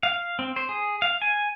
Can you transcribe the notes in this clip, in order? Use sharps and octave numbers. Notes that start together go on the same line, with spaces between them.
F5
C4
C5
G#4
F5
G#5